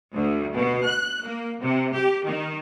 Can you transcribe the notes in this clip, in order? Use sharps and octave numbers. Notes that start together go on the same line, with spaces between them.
D2
B2
F#6
A#3
C3
G4
D#3